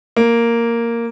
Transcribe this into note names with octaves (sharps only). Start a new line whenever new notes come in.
A#3